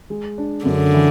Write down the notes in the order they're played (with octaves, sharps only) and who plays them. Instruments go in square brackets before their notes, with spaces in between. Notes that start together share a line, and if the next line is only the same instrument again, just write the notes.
[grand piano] G#3
D4
[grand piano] F#2 [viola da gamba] D3
[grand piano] E3